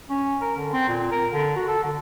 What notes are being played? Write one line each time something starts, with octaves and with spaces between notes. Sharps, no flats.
C#4
A#4
D3
C4
A#2
A#4
D3
F#4
A4
D3